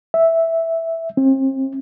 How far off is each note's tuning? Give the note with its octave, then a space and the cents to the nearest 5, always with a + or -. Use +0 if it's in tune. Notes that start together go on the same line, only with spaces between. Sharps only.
E5 -5
C4 +35